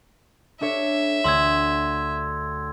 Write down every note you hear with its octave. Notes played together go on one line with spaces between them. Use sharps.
D4 A4 C#5 E5
D2 C6 E6 G#6